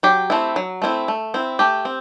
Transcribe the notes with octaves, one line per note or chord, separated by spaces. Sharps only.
F#3 G4
A3 C4 E4
F#3
A3 C4 E4
A3
C4 E4
A3 G4
C4